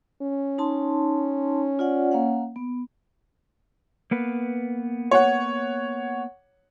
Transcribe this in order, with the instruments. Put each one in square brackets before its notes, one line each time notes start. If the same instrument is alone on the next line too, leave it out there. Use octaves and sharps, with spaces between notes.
[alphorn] C#4
[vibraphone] D#4 A5 C6
F4 D5 F#5
A#3 F5 F#5
B3
[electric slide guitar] A#3 B3 B4
[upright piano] C#5 F#5